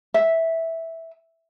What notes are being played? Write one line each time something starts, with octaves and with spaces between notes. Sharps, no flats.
E5